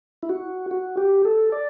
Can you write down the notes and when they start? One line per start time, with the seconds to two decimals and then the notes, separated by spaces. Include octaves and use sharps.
0.23 E4
0.29 F#4
0.71 F#4
0.97 G4
1.25 A4
1.52 D5